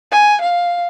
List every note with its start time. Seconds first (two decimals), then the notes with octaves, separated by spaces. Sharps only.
0.11 G#5
0.41 F5